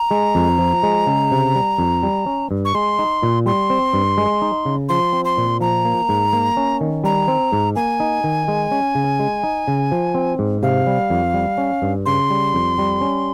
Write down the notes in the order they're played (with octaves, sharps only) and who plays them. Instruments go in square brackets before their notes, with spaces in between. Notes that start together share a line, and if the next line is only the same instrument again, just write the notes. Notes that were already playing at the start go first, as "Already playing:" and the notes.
Already playing: [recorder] A#5
[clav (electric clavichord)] G#3
F2
F3
G#3
C#3
C3
G3
F2
G3
C#4
G2
[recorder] C#6
[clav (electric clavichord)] G#3 [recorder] C6
[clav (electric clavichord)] D#4
A#2
[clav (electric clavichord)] G3 [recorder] C6
[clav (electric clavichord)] C4
G2
G#3
D#4
C#3
[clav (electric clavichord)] F3 [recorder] C6
[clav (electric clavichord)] C4
[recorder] C6
[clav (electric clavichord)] A#2
[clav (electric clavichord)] F3 [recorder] A#5
[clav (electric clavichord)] A#3
G#2
A#3
C#4
D#3
[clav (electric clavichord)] G3 [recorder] A#5
[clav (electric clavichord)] C4
G#2
[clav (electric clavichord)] A#3 [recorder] G#5
[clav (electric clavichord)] D#4
D#3
G#3
C#4
C#3
G#3
D#4
C#3
F3
C4
G#2
[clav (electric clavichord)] C3 [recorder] F5
[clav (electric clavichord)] G3
F2
G3
C#4
G2
[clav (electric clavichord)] C#3 [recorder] C6
[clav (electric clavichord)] G3
F2
G3
C#4